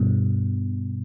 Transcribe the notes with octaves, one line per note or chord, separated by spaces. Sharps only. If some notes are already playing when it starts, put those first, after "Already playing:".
Already playing: G2 B2